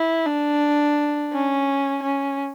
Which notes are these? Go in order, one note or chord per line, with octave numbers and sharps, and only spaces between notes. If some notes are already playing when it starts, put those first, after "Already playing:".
Already playing: E4
D4
C#4
C#4